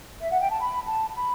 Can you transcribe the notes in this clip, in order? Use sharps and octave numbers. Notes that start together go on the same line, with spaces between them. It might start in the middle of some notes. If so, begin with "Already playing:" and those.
E5
F#5
G5
A5
B5
A5
B5